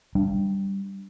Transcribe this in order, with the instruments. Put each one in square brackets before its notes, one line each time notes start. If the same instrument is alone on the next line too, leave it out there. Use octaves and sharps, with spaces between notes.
[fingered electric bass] G3 D4